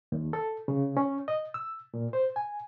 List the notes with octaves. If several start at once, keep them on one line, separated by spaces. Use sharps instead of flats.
D#2
A4
C#3
C#4
D#5
E6
A#2
C5
G#5